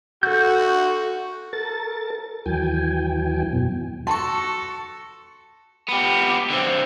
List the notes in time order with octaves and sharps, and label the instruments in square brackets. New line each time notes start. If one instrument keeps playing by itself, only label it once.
[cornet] F#4 [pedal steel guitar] A4 G6
[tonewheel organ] A4 A#4 A6
D#2 E3 F#3 G5 G#5
F#2 B2
[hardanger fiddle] F#4 A4 [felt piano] A5 [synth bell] C6 C#6
[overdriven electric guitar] B3 G4
D3 C4